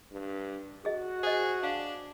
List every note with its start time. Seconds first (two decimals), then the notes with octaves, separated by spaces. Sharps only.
0.12 G2
0.85 F#4 G#4 D#5
1.23 G#4 C5 D#5
1.63 D4 F5